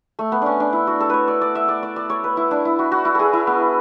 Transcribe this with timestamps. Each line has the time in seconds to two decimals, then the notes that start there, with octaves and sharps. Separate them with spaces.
0.19 A3
0.32 B3
0.42 C#4 D4
0.60 D4
0.73 E4
0.87 F#4
1.00 A4
1.10 B4 C#5
1.28 D5
1.41 D5
1.55 E5
1.68 D5
1.83 D5
1.96 D5
2.10 C#5
2.24 B4
2.37 E4
2.51 D4
2.65 E4
2.79 F#4
2.92 F#4
3.05 E4
3.15 G#4 A4
3.33 E4
3.47 B3